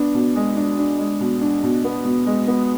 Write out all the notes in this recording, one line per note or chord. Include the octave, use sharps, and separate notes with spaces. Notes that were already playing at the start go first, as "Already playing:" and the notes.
Already playing: B3 D4
B2
G#3
D4
D4
G#3
B2
D4
B2
B3
B2
G#3
B3